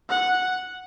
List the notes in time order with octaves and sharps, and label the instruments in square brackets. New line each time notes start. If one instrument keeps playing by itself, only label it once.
[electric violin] F#5